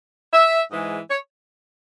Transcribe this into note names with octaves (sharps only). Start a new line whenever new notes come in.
E5
G#2 E3 G#3 D#5
C#5